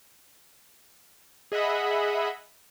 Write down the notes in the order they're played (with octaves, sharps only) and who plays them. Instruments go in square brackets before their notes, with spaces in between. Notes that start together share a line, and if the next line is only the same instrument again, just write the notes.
[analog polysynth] G#4 D#5 E5 F#5 B5